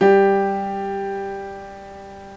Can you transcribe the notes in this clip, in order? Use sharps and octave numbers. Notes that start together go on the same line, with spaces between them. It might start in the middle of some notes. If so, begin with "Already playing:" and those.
G3 G4